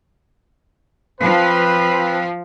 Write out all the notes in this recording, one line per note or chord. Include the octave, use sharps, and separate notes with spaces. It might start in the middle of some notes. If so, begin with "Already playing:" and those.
F3 C4 B4